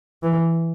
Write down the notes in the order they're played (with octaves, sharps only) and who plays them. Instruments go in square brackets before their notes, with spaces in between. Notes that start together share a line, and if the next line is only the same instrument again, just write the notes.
[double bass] E3